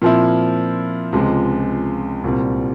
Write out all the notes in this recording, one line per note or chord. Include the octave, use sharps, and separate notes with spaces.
A#2 F3 C4 E4
C#2 C3 F3 G#3
C2 A#2 G3 C4